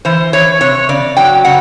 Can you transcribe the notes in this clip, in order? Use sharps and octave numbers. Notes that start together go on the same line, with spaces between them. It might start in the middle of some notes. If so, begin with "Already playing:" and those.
E3 C5
E3 C#5
C3 C#5
C#3 D5
F#3 G5
C#3 F#5